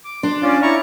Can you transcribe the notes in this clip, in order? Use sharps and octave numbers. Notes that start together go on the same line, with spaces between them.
D6
D4 C6
C#4 F4 D5
E4 A#5 C#6